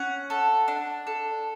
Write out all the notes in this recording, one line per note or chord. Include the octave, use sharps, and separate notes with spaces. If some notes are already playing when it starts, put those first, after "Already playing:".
Already playing: C#4 F#5
A4
D4
A4